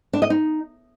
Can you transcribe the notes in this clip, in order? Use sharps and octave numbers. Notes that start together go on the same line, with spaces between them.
D4
D#5
D#4